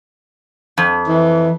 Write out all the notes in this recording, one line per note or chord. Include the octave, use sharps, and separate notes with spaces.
F2
E3